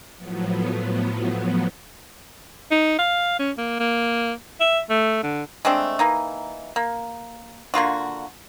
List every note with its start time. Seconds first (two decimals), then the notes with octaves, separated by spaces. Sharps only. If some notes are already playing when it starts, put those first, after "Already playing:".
0.17 A2 F3 F#3 B3
2.71 D#4
2.99 F5
3.39 C#4
3.58 A#3
3.80 A#3
4.60 E5
4.90 A3
5.23 D3
5.65 G#3 A3 C4 D4
5.99 E3 A#3 D#4
6.76 A#3
7.74 D3 A#3 F4 F#4